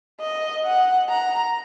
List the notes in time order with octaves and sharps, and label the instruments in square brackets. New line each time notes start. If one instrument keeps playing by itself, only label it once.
[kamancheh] D#5
F#5
A#5